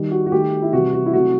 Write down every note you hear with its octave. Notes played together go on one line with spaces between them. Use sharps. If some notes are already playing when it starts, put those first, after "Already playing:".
Already playing: D#3 G3
F#4
F#4
D#3 A3 G4
E4
C3 E3 G3 F#4
F#4
E4
C3 F#3 A3 F#4